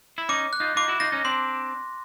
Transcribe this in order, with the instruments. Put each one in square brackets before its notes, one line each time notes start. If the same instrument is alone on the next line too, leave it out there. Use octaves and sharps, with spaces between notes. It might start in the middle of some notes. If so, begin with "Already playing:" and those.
[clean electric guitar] E4
[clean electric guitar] C#4 D#4 [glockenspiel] D6
[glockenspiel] F#6
[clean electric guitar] D#4 F4
[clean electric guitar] D#4 F4 [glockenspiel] D6
[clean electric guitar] E4 F#4
[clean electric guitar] D#4 F4 [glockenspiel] A#6
[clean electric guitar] C#4 D#4
[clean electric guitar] C4 D4 [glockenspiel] C6